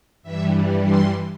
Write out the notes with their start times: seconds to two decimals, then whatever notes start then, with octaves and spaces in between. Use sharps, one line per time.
0.22 G2 E3 G3 E5
0.84 C6